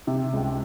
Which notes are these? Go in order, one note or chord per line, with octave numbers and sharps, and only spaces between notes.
C3
C#2